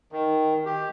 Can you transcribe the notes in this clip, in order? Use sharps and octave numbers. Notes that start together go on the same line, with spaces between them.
D#3
G4